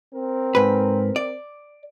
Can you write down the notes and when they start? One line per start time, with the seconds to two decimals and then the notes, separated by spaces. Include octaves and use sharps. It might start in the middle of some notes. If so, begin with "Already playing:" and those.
0.14 C4 A#4
0.55 G#2 B4
1.16 D5